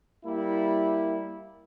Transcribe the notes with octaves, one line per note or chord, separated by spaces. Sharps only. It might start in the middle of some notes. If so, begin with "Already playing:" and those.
G3 A#3 E4